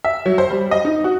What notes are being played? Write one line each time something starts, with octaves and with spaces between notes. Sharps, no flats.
E5
F#3
C5
G3
D#5
D#4
F#4